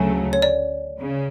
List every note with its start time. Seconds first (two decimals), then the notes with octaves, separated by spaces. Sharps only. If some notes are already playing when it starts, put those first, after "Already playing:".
Already playing: D2 C#3 F#3 A3 G#5
0.33 C#5
0.42 D5
1.00 C#3